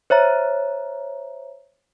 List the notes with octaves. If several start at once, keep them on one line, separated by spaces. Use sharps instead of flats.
C5 C#5 E5 A#5